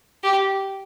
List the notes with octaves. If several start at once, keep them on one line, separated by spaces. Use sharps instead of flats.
G4